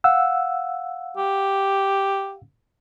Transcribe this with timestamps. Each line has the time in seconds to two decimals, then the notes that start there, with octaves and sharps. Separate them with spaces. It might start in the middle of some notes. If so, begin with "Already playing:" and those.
0.04 F5 F#5 E6
1.17 G4